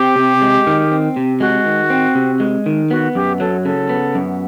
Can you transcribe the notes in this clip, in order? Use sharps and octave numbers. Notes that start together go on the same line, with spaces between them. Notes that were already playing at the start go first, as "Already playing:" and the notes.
Already playing: C4 G4
C3
G#3
D#3
C4
C3
G#3 F#4
D#3
C4
C3
G#3
D#3
B3 F#4
F#2 G4
F#3 A4
C#3 A4
B3
F#2